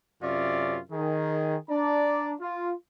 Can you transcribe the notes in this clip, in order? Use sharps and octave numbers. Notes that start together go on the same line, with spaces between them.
F#2 C3 C#4 F4 D5 E5
D#3 G#4
D4 D5 A#5
F4